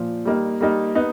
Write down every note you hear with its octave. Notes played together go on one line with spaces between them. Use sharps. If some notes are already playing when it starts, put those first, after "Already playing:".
Already playing: A#2 F3
G3 A#3 D#4
G3 A#3 D#4
B3 D#4